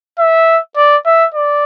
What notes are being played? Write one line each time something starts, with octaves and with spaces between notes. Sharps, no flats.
E5
D5
E5
D5